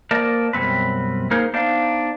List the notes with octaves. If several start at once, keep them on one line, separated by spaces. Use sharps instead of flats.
A#3 A#4 C5 D5 D#5 A5
F#2 B2 G3 C4 B4
A#3 D#4 G#4 A#4 C5
B3 D4 D#4 C5 F5